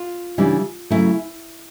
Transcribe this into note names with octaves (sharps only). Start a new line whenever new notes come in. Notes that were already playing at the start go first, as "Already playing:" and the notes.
Already playing: F4
C#3 E3 G3 B3 D4
C#3 F#3 A3 E4